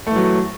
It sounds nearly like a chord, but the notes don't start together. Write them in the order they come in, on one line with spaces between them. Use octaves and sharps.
A3 E3 F#3